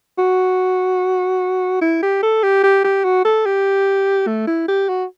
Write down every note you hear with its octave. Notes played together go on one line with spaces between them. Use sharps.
F#4
E4
G4
A4
G4
G4
G4
F#4
A4
G4
A3
E4
G4
F#4